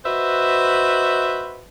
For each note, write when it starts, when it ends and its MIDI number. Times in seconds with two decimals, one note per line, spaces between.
0.05 1.67 66
0.05 1.67 71
0.05 1.67 72
0.05 1.67 75
0.05 1.67 76